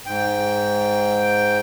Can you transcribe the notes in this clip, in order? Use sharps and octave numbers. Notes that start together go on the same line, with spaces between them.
G#2 G5